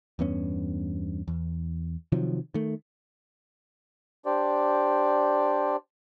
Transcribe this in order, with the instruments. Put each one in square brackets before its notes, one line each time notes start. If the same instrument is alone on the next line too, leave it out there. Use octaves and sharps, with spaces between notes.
[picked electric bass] E2 G2 B3 C#4
E2
C3 D#3 F3 F#3
D#3 A3
[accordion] D4 G4 C5 D5